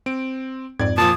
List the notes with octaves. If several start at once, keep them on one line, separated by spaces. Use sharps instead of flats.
C4 D7
F2 G#2 D5 G#6
A#2 F3 A5 D#6